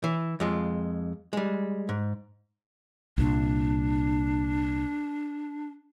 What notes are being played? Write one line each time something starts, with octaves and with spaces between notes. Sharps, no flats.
E3 E4
F2 G#3 F4
G3 G#3
G#2
C2 A#2 D4